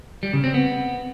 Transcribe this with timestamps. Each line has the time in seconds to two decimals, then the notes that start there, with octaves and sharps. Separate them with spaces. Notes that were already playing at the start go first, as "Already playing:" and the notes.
0.23 G3
0.33 C#3
0.44 C4
0.54 B3